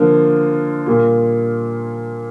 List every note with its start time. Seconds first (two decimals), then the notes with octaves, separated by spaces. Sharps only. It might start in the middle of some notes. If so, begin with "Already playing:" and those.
Already playing: D3 F3 A#3 F4
0.86 A#2 G3 A#3 F4